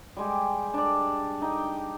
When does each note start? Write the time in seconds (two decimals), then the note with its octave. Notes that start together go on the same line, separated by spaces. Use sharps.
0.17 G3 G#3 G4
0.74 D4 D5
1.42 D#4 G5